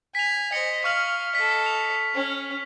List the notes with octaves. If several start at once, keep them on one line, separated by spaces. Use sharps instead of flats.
G#5 B6 F7
C5 D#5 C#7
F5 C#6 F6 F#7
A4 D#5 B6
F7
C#4